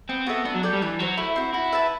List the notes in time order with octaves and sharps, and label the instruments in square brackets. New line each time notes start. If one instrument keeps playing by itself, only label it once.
[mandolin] B3 [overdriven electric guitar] C4
[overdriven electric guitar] B3 [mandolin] F#4 A4 E5
[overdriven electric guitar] B3 [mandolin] D4
[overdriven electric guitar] F#3
[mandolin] A4 D5 G5
[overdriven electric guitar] G3
[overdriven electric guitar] E3 [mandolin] D4
[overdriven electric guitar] F#3 [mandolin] F#4 C5
[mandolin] A3 [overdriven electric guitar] E4
[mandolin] C4 F#4
[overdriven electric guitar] E4 [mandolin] F#4
[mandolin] B4 E5 A5